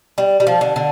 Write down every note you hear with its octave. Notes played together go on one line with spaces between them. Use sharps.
G3
G3
F3
D3
D3